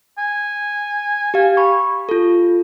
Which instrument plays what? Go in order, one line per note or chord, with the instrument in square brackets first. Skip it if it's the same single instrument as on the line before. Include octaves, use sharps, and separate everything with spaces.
[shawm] G#5
[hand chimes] G4 F5
B5 C#6
F4 A4